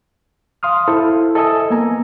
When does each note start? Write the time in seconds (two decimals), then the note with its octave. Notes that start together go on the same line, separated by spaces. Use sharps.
0.63 F5 C6 D#6 F6
0.88 E4 A4 C5
1.35 A4 D#5 E5 G#5 D#6 E6
1.70 A#3 B3 G#5 A#5